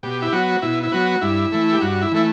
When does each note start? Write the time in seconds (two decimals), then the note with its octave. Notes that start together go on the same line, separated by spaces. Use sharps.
0.03 B2 G4
0.22 E4
0.32 F#3 B3 F#4
0.62 B2 E4
0.83 E4
0.92 F#3 B3 F#4
1.21 G2 E4
1.52 E3 A3
1.72 G4
1.81 G2 F#4
2.02 E4
2.12 E3 A3 E4